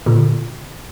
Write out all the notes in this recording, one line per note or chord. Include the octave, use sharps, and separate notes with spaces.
A#2 D3